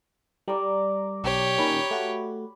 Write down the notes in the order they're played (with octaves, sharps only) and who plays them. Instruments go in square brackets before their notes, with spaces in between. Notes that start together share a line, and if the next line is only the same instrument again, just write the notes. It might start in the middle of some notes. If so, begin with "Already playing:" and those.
[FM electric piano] G3 [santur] A#4 D5 D6
[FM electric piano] B1 [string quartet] G4 C#5
[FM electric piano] A#2 D#3 C#4 [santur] B5
[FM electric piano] A3 F#4